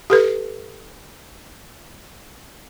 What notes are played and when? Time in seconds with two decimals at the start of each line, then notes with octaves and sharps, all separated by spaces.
0.10 G4 A4 B4